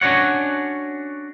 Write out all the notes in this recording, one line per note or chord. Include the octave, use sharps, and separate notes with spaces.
C#4 D4 F#4 C#5 F#5